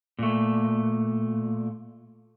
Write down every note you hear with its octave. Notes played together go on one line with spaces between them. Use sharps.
A#2 A3